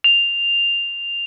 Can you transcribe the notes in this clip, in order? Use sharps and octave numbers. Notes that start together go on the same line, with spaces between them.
F7